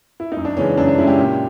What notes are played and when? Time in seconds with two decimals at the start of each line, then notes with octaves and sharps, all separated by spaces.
0.20 E4
0.32 F#2 D#4
0.45 D4
0.57 C#3 E3 G#3 C#4
0.78 F#2 D4
0.88 D4
0.98 C#3 E3 G#3 E4
1.07 G4
1.18 A#2